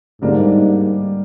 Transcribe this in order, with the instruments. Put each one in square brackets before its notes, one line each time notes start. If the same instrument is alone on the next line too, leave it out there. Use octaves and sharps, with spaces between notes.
[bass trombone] G#2 [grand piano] D3 G3 A#3 D4